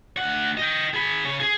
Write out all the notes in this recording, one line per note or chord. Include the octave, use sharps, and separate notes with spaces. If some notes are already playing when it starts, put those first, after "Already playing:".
D2 F#5
D#5 G5
G#4 B5
C#3 C#5
G#4